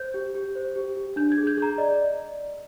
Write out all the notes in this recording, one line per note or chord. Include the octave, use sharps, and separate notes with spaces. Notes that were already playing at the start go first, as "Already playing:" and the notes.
Already playing: C5 G6
G4
G4
C5
G4
G4
D4 G6
G#6
G#4
G6
G#4
A#5
D5 D#5